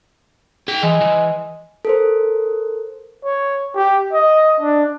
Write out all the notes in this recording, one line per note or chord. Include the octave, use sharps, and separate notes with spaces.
G#4 G5
E3 G#3
E3
A4 A#4 C5
C#5
G4
D#5
D4